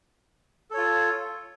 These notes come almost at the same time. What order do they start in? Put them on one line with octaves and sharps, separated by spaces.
A4 C#5 F4